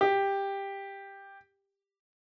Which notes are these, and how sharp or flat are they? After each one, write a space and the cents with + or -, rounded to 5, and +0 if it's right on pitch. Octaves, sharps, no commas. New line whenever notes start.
G4 +10